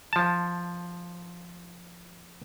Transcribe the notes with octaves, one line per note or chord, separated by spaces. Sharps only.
F3 A5